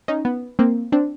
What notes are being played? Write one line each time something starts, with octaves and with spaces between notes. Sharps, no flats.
C#4 D#4
B3
A#3 C4
C4 D4